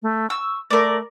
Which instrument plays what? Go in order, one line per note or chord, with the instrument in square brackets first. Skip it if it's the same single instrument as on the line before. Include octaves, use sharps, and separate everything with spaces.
[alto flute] A3
[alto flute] C#6 [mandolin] E6
[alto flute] A3 [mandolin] A#4 D5